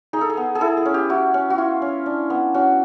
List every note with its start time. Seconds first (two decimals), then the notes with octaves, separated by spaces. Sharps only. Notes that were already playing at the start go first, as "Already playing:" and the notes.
0.13 D#4 G#4
0.21 A4
0.30 G#4
0.37 B3
0.55 G#4
0.61 E4 A4
0.77 G#4
0.85 C#4
0.94 G4
1.09 E4 F#4
1.34 C#4
1.50 F#4
1.58 E4 F4
1.82 C#4
2.06 D4
2.30 B3
2.54 C#4 F#4